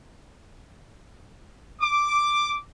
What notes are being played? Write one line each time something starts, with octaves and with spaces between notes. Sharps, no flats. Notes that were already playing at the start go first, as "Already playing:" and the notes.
D6